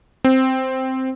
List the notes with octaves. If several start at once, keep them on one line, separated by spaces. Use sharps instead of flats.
C4